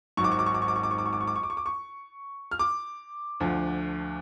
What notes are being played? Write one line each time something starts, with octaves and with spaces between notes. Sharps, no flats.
G#1 G#2 F#3 C#6
D6
C#6
D6
C#6
D6
C#6
D6
C#6
D6
C#6
D6
C#6
D6
C#6
D6
C#6
D6
C#6
D6
C#6
F6
D6
D2 D3 F3